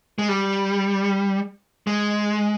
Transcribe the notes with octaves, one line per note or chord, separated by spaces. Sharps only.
G#3
G3
G#3